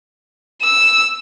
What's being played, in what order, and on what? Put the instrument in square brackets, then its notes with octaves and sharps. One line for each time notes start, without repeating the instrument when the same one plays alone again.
[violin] E6